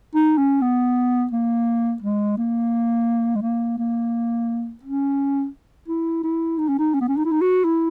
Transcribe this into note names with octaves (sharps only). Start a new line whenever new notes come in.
D#4
C#4
B3
A#3
G#3
A#3
G#3
A#3
A#3
C#4
E4
E4
D#4
C#4
D#4
C#4
B3
C#4
D#4
E4
D#4
F#4
E4